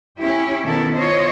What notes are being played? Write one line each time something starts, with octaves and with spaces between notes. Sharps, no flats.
C#4 E4 G4
B2 D#3 A#3 B3 E4 A4
F4 C5 C#5 D#5